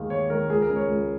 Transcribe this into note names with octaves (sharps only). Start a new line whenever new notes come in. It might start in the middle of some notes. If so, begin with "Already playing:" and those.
Already playing: D#2 D#3 G#3 F5
D#2 C#5
D#3 G#3 A#4
C#2 G#4
A#4
C#3 G#3
C#5
C#2